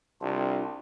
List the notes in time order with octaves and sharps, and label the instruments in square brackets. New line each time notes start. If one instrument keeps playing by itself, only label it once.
[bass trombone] C2 [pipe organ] D4 F4